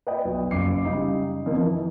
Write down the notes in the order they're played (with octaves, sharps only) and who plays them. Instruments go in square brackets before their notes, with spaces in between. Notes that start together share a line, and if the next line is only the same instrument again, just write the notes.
[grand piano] B4 D5 D#5 G5
B1
F#1 D6 C7
C#3 G3 D#4
F2 D#3 A#3
E3